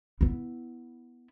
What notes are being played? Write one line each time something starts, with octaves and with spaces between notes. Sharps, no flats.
B3 E4